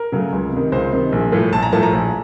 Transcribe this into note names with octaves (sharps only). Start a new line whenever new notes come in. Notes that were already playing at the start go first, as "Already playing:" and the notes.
Already playing: A#4
C#3 F#3 A3
C#2
C3 D#3
C#2 C5
C3 D#3
A#1
A2 F3 A3
A#1 A5
A#5
A2 F3 A3 A5
A#5
A#1